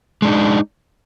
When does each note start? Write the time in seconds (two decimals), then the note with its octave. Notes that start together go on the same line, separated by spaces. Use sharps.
0.22 G#3
0.25 D4
0.27 D#4